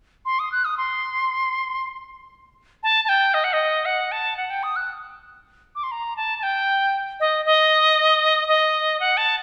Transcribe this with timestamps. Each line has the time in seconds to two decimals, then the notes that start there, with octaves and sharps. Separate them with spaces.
0.25 C6
0.39 D#6
0.52 F#6
0.65 D#6
0.77 C6
2.83 A5
3.05 A5
3.09 G5
3.34 D#5
3.44 F#5
3.53 D#5
3.85 F#5
4.12 A5
4.37 F#5
4.50 G5
4.63 D#6
4.76 F#6
5.75 D6
5.83 C6
5.91 A#5
6.16 A5
6.38 A5
6.43 G5
7.20 D#5
7.45 D#5
8.48 D#5
9.00 F#5
9.17 A5